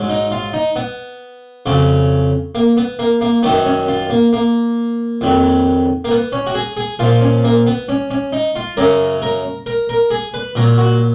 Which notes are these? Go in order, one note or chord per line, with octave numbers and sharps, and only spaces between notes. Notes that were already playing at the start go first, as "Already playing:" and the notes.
Already playing: G#2 F#3
D#4
F4
D#4
B3
F2 C#3 F#3
A#3
B3
A#3
A#3
F#2 D#3 F#3 B3
C#4
F4
A#3
A#3
F2 D#3 F#3
A#3
B3
C#4
F#4
G#4
G#4
A#2 F3 F4
C#4
A#3
B3
C#4
C#4
D#4
F4
F#2 C#3 F#3 A#4
A#4
A#4
A#4
G#4
B4
A#2 F#3 A#4
F#4